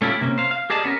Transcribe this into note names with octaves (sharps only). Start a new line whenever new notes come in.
A3 C#4 E4 F4 G4
C3 A#3 C#4
C5 F5
F5
G4 G#4 A#4 D5 D#5 A5
B3 C#4 A4 A#4